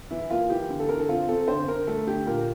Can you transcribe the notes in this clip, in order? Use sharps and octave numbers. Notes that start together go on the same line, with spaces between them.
E3 E4
A#3 F4
E3 G4
D3
A4
D3 A#4
A4
C4 F4
C4 A4
D3 C5
D3 A#4
A3 A4
D3 G4
A#2 A#4